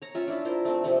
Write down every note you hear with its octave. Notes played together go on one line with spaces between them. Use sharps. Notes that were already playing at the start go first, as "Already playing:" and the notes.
C#5 A#5
C#4 F4 E5
D4 E4 F4
E4 A#4 C5
A3 C4
C3 F3 A3 C5